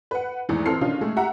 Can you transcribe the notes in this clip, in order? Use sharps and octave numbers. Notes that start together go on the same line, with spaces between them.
B4 F#5
G#1 E2 A2 G#3
E3 F3 C4 A4 F6 C7
D3 D#3 C#4 D#4 F4
G#3 A3 G#4
G4 E5 F#5 A#5